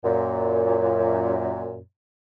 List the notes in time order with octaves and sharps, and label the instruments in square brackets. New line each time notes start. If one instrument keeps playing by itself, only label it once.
[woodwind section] F#2 A#2